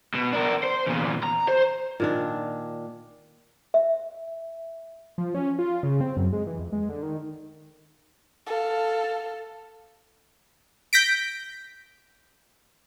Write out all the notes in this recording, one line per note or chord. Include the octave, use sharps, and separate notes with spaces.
B2
D4 A#4
C5
E2 A#2
A#5
C5
A#2 D#3 D4
E5
F3
C#4
F4
C#3
C4
F#2
G#3
E3
F2
G#3
D3
D#3
A4 F5
G6 A#6 B6 D7